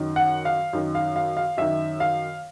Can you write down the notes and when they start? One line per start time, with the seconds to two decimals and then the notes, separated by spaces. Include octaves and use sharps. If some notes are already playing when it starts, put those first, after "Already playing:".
Already playing: F#2 D#3
0.16 F#5
0.45 F5
0.73 F#2 D#3
0.95 F5
1.16 F5
1.37 F5
1.57 F#2 D#3 E5
2.00 F5